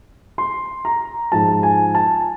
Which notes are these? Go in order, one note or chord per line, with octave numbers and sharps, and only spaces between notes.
C6
A#5
G#2 F3 A5
G#5
A5